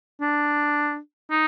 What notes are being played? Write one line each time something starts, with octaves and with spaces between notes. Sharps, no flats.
D4
D#4